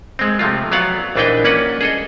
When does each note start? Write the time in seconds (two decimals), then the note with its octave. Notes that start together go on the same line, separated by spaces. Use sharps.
0.19 G#3 C4
0.39 C3 F3 A3 F4
0.72 F#3 B3 D5 F5 F#5
1.16 A#1 E3 D4 D#4 B4 G5
1.44 A#3 C#4 B4 D5 F#5
1.81 G#4 A4 D#5